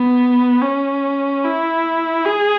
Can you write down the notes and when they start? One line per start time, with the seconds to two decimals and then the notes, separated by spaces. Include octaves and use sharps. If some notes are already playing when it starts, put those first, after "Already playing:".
Already playing: B3
0.62 C#4
1.44 E4
2.25 G#4